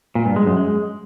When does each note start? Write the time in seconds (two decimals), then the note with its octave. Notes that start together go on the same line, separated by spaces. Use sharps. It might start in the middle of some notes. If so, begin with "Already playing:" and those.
0.15 A#2
0.26 G2
0.36 G#3
0.46 F#2
0.57 G#3